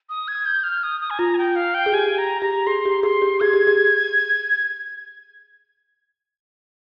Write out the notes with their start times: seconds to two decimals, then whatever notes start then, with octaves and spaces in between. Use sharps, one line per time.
0.09 D#6
0.28 G#6
0.46 G6
0.64 F6
0.83 D#6
1.01 D#6
1.10 G#5
1.19 F4 A#5
1.34 G#5
1.38 G5
1.56 F5
1.74 G5
1.86 G#4
1.92 G4 G#5
2.18 A#5
2.42 G4 A#5
2.67 G#4 C6
2.85 G4
3.03 G#4 C6
3.22 G4
3.40 G#4 G#6
3.53 G4
3.67 G#4